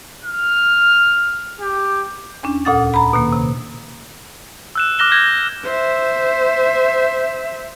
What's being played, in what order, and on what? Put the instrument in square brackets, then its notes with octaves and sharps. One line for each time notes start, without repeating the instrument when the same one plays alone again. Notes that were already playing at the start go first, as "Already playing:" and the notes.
[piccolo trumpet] F6
G4
[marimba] E2 C#4 D4
D2 A#2 A4 F#5 D#6 A6
A#5 B5
B2 D#3 A#3
C3
[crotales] E6 F#6 E7
D6 F6 F#6 A#6 E7 G7
G6 G#6 A#6
[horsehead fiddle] C5 E5